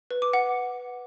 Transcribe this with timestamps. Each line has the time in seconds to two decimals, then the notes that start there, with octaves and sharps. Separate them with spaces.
0.11 B4
0.22 D6
0.33 F#5